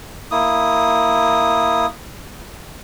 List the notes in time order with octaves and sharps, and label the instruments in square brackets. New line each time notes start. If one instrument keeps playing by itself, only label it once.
[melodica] A#3 E4 D#6